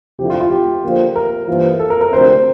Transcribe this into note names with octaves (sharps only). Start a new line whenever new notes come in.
D2 C3 F3 A3 E4 G4
F4
F4
G4
D3 F3 A#3 F4 C5
A#4
G2 E3 A#3 F4 C5
A4
A#4
A#4
D2 C3 F3 C4 C5